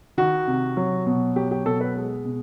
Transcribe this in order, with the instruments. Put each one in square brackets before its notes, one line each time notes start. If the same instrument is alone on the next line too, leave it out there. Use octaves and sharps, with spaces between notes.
[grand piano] D#3 F#4
C3
F#3
B2
F#3 G4
G4
B2 A4
B4
G#3
B2